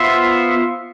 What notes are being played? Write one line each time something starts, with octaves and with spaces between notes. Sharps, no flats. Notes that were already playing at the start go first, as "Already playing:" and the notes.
Already playing: B3 F4 C5 E5